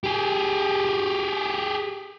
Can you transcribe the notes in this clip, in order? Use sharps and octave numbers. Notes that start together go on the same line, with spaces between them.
G4 G#4